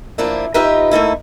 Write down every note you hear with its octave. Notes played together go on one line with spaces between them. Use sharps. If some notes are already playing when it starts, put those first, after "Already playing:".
F3 A#3 D4 E4
D#4 F4 G4 B4 D#5 E5
A3 A#3 D#4 E4